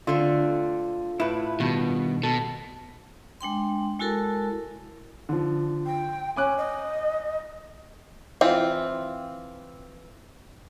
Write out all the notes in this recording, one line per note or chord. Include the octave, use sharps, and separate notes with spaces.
D3 A3 C4 F4
A2 E4 B4
G2 B2 D#3
B2 A4
G#3 D4 G5 C6
G#3 E4 F#4 A4 A#4 A5
D3 F3
G5
C#4 G#5 D6 F#6
D#5
E3 C4 F4